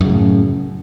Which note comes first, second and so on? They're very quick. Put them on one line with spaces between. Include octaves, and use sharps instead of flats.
F#2 C#3 A2